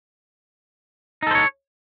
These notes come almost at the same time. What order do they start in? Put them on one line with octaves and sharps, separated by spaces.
D#4 A4 C5 C#5